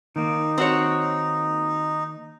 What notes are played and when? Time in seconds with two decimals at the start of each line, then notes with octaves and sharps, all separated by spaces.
0.16 D#3 A#3 D#4
0.58 C4 F#4 C#5